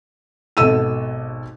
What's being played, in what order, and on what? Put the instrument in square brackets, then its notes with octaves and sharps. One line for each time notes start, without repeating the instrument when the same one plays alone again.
[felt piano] G#1 B2 A4 E6 D#7